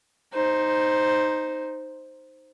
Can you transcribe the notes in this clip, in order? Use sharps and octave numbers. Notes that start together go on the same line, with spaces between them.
D#4 C5